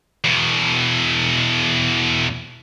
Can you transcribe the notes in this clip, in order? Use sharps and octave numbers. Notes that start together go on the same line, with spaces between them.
E2 B2